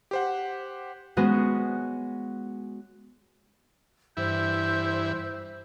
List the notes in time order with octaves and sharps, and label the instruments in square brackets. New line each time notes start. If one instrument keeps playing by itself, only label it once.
[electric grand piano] G4 C5 F#5
[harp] G#3 B3 C#4 F#4
[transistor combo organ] G2 E3 E4 [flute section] C5 G6